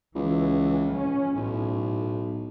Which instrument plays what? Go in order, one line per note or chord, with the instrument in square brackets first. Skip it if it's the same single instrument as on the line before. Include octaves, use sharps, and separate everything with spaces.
[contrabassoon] C#2 [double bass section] E3
[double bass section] C#4
[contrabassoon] B1 [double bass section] A2